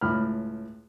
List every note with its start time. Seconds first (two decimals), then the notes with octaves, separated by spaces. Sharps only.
0.01 C#2 A2 B5 F6